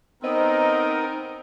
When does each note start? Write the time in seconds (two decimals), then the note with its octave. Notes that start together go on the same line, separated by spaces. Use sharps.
0.23 B3 C4 D#4 A#4 D#5